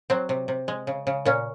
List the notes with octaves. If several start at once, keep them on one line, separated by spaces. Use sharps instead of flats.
F#3 C4
C3
C3
G#3
C#3
C#3
A#2 C#4